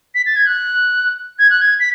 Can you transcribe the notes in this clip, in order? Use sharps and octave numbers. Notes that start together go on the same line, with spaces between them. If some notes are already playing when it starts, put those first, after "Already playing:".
B6
A6
G#6
F#6
G#6
F#6
G#6
B6